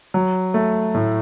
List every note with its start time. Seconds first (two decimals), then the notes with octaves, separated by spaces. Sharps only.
0.14 F#3
0.54 A3
0.95 A2